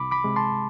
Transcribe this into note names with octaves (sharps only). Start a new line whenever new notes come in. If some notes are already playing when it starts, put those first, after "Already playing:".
Already playing: C2 B5 D6
B5 D6
C3 G#3
A5 C6